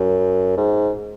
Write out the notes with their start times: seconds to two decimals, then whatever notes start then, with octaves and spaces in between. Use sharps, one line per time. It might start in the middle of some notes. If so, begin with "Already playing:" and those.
Already playing: F#2
0.57 G#2